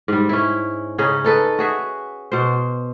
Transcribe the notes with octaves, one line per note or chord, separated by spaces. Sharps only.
G#2 G3
C#4 E4
C#3 C#4 D#4 G#4
D#4 A4 B4
F#4 G#4 E5
B2 C5